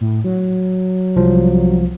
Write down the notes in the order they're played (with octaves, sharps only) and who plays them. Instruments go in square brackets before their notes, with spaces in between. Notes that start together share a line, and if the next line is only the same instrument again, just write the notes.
[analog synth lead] A2
F#3
[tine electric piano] C2 F3